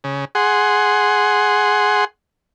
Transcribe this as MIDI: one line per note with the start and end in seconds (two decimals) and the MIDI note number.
0.04 0.25 49
0.35 2.05 68
0.35 2.05 78
0.35 2.05 84